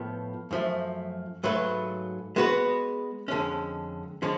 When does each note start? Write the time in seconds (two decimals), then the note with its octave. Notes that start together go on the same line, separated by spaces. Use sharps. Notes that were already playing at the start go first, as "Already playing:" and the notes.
Already playing: A2 F3 B3 F4 A4
0.51 F#2 F3 A3
1.43 G#2 F#3 A3 F4 B4
2.36 G#3 B3 F#4 B4
3.28 F2 D3 G#3 C#4
4.22 D3 F3 G#3 C#4